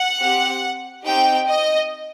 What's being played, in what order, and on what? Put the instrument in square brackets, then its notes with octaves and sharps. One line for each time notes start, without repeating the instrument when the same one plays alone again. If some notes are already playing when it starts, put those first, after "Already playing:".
Already playing: [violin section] F#5
C4 G4
C4 D#4 G4 G5
D#5